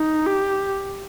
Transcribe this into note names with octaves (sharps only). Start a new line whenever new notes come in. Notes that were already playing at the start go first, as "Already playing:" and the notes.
Already playing: D#4
G4